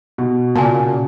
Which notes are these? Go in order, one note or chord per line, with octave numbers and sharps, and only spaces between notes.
B2
A#2 C#3 G#5 A5